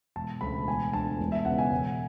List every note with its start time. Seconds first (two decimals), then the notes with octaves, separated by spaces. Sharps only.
0.16 E1 A5
0.41 D2 C#3 B5
0.67 E1 G#5
0.93 D2 D3 A5
1.20 E1
1.32 E5
1.45 E2 C#3 F#5
1.58 G#5
1.72 E1